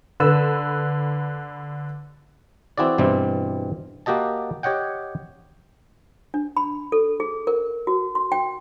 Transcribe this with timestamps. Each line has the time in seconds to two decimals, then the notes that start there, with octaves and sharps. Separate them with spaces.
0.20 D3 B4 E6
2.78 E3 C4 E4 F#4 G#4 D5
2.98 G2 B2 E3 G3 C4
4.06 A#3 F#4 G4 D#5 A5
4.63 G4 C#5 D#5 F#5 G5
6.34 D4
6.57 B5
6.92 A4
7.20 G#4
7.47 A#4
7.87 F#4
8.15 C6
8.32 G5